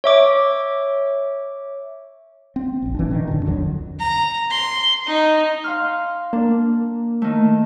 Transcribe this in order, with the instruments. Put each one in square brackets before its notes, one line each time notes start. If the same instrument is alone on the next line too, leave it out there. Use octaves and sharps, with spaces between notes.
[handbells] C#5 E5 D6
[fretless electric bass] C4
F1 A#1
E3 C#4 D4
A#2 D3 D#3
D1 F#2 D4
C2 F2 D3 F#3
[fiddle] A#5
C6
D#4
[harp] F5 C6 F6
[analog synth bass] A#3 [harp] D4
[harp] D#3 A3